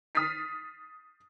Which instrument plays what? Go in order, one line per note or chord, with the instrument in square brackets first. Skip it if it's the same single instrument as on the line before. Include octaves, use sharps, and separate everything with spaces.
[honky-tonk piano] D#6 F6 A6 B6 C7